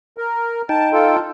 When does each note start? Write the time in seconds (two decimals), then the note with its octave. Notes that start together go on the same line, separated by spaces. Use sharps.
0.18 A#4
0.69 D#4 G5 A5
0.93 F4 A4